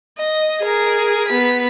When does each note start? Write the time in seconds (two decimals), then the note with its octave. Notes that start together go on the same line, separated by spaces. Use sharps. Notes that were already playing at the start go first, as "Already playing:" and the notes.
0.18 D#5
0.62 G#4 A#4
1.28 B3 B6